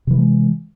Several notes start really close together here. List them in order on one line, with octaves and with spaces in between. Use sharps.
C3 E3 F#3 G#3